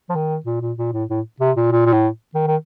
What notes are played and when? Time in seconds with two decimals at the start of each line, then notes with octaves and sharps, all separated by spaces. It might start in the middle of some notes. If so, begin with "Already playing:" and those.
0.09 F3
0.15 D#3
0.46 A#2
0.62 A#2
0.78 A#2
0.93 A2
1.09 A2
1.40 C3
1.56 A#2
1.72 A#2
1.86 A#2
1.93 A2
2.34 D#3
2.47 D#3